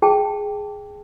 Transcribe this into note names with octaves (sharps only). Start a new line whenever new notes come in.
G#4 G5 A5